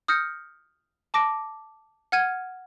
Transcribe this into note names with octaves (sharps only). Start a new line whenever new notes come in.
D#6 F6 G6 A#6 C#7
A5 D6 A#6 D7
F#5 F6 G#6 D#7